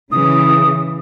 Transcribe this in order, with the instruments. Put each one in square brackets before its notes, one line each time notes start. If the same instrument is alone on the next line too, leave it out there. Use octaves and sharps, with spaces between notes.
[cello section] C#3 E3 [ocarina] D#6